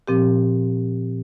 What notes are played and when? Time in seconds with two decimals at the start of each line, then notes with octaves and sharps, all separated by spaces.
0.08 A#2 F3 C4 G4